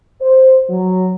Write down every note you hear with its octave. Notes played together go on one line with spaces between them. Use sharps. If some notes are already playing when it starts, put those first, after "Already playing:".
C5
F#3